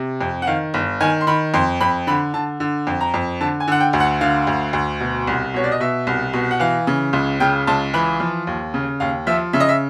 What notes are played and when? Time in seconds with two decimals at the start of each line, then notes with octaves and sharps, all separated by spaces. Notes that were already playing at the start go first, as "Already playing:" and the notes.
Already playing: C3
0.21 F2
0.42 F#5
0.47 D#3 F5
0.74 G1
1.00 D#3 G#5
1.21 C6
1.27 D#3 B5
1.54 F2 C6
1.80 F2 B5
2.07 D3 B5
2.34 D3 A5
2.60 D3
2.87 F2
3.01 A#5
3.14 F2
3.40 D3 A5
3.60 G#5
3.68 D3 F#5
3.80 G5
3.93 D2
4.00 F#5
4.21 D3 F5
4.47 D2
4.73 D2
5.01 B2
5.27 C2
5.54 B2 C#5
5.64 D5
5.72 D#5
5.80 B2 E5
6.07 C2
6.33 B2
6.51 F#5
6.60 E3 F5
6.87 C#3
7.13 C#2
7.40 C#3 G5
7.67 C#2 A5
7.94 E3 B5
8.20 F3
8.47 D#2
8.74 C#3
9.00 D#2 F5
9.27 F3 E5
9.53 C#3 E5
9.60 D#5
9.69 E5